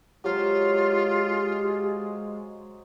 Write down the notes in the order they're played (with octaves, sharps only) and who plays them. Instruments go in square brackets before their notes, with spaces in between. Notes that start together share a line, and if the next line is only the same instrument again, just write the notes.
[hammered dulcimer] F#3 C5 F5 [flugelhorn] G#3 [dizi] F4 [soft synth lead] G4